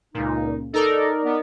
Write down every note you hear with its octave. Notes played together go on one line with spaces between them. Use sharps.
C#2 A#2 D#4
D#4 A4 A#4 D5
B3